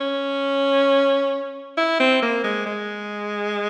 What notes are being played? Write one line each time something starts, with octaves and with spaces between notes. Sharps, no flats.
C#4
E4
C4
A#3
G#3
G#3